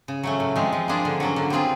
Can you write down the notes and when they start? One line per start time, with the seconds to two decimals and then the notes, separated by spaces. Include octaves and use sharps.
0.08 C#3
0.23 F#3 A3 C#4
0.40 A2
0.56 F3 G#3 C4
0.73 F3
0.88 A#3 D4 F4 G#4
1.05 D3
1.20 F#3 A#3 C#4
1.36 D3
1.50 G3 C4 F4 G#4